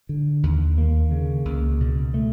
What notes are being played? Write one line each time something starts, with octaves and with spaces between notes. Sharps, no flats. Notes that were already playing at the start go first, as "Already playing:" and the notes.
D3
D#2
A#3
C#3
C#2
B2
A3